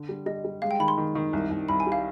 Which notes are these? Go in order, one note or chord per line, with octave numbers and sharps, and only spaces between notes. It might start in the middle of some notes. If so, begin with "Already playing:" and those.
Already playing: D3
G3
G3 D#5
G3
G#3 F5
G5
D#3 B5
C6
D#3
D#3
C2
C2
C2 B5
G#5
G3
F5